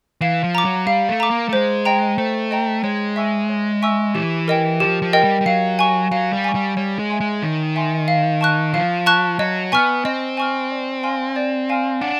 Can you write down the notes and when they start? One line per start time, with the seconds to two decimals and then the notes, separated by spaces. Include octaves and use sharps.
0.21 E3 F5
0.44 F3
0.55 A#5 D6
0.65 F#3
0.87 G3 F5
1.09 A3
1.20 A#5 D6
1.31 A#3
1.49 A3
1.53 G#3 C5
1.85 D#5 G5 A#5
2.18 A3 C5
2.51 D#5 G5 A#5
2.84 G#3 C#5
3.16 E5 G#5 C#6 E6
3.49 C#5
3.82 E5 G#5 C#6 E6
4.15 E3 G4
4.48 A#4 D#5 G5
4.80 F3 G4
5.02 F3
5.13 A#4 D#5 G5
5.24 G3
5.41 G3
5.46 F#3 F5
5.79 G#5 C#6
6.11 F#3 F5
6.33 G3
6.44 G#5 C#6
6.55 G3
6.77 G3 C#5
6.99 G#3
7.10 E5 G#5 C6
7.21 G#3
7.42 D#3 C#5
7.76 E5 G#5 C6
8.08 F5
8.41 A5 C#6 F#6
8.73 F3 F5
9.06 A5 C#6 F#6
9.39 F#3 D#5
9.72 B3 G#5 C#6 F6
10.05 C4 D#5
10.37 G#5 C#6 F6
10.71 D5
11.03 F5 G#5 C6 F6
11.36 D5
11.69 F5 G#5 C6 F6
12.01 D4 F#5